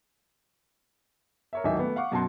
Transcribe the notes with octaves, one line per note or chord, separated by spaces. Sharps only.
A#4 C#5 E5
D1 G#1 D#3 D#5 E5 G#5
A3 B3
F5 F#5 C#6 D6
F#2 B2 F#4 A5 C6